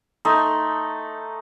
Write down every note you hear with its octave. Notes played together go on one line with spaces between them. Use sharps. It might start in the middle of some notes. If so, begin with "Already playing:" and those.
A3 D#4 C6